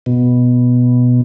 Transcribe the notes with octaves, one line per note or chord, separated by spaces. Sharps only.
B2